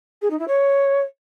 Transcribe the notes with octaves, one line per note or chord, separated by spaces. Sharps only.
G#4
D#4
E4
C#5